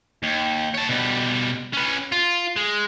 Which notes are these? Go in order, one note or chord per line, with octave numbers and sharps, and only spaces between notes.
D#2
C#5 A5
B2 G3
C#4 B4
F4
G#3